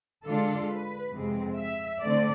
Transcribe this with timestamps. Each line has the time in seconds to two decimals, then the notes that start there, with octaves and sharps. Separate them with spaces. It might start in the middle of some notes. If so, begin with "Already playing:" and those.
0.24 D3 G#3 D4 F4 A4
0.68 B4
1.13 F2 C3 G#3 C4
1.58 E5
2.02 D3 A3 C4 D5